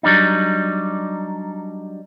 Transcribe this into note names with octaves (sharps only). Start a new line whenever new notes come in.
F#3 G3 D4 D#4